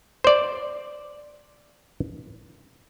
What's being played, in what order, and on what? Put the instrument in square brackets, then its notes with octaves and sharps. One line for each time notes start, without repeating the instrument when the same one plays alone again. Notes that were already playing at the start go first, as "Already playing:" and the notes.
[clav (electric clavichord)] C5 D5